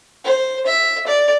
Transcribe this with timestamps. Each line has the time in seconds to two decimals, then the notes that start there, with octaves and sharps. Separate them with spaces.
0.24 C5
0.66 E5
1.07 D5